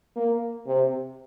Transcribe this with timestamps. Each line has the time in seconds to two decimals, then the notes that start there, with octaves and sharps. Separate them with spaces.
0.16 A#3
0.66 C3